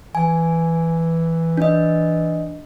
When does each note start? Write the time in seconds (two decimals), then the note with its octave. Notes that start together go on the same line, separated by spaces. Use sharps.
0.15 E3 G#5
1.57 D4 D#5